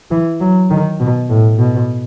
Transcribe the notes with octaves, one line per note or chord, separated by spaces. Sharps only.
E3
F#3
D#3
B2
A2
B2